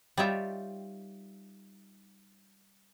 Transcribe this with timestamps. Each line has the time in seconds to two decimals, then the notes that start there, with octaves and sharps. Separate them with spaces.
0.17 G3 D#4 F4 C#5 E5 G5